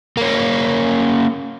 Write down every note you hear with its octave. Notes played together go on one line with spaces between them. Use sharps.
A#3 C#4